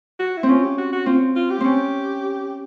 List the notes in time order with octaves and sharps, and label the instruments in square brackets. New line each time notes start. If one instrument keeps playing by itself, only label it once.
[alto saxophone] F#4
E4
[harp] C4
[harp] C#4 [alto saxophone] F4
[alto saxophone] G4
F#4
F#4
[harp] C4 [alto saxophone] F4
[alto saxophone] F4
G4
[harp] C4 C#4